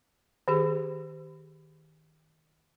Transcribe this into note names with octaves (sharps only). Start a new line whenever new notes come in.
D#3 G4 G#4